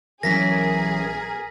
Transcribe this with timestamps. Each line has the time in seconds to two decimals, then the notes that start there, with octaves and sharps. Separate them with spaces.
0.23 B1 E3 F#3 C#4 G#4 A#4 A#6 B6